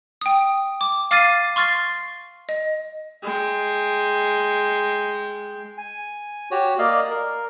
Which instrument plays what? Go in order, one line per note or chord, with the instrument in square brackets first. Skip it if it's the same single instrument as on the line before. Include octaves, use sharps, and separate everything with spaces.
[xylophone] G5 D#6
D6
F5 D6 F6 A6 C7 D#7
C6 C#6 F6 A6 C7
D#5
[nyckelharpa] G#3 G5
[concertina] G#5
F#4 G4 C#5
A#3 D5 D#5 F5
A#4